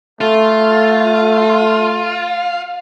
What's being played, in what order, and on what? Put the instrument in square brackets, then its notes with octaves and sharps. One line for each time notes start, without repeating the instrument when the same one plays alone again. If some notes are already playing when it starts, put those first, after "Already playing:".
[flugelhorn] A3 [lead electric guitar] F4